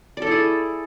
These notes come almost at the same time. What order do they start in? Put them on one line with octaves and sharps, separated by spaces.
D5 A4 E4 G#4